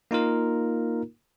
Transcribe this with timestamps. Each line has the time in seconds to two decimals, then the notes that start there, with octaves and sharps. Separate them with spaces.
0.11 A#3 D#4 F4 A#4